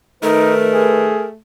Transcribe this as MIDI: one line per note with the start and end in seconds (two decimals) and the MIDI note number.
0.23 1.16 51
0.23 1.37 57
0.23 0.54 63
0.23 1.26 70
0.23 1.16 71
0.74 1.30 68